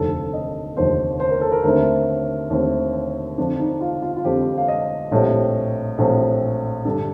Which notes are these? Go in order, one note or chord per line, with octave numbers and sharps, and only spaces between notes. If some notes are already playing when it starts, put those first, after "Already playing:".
Already playing: F1 D#2 D3 F3 A4
D#5
F1 D#2 D3 F3 C5
C5
A#4
A4
A#4
D#2 D3 A3 C4 A#4
D#2 D3 A3 C4
F2 D3 F3 D4
D#4
F4
F4
F4
F2 D3 F3 G4
F5
D#5
A#1 A2 G3 C4
A#1 A2 G3 C4
G2 D3 G3 D4 A4